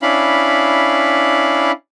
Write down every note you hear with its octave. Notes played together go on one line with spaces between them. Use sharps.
C#4 D4 E4 F5 B5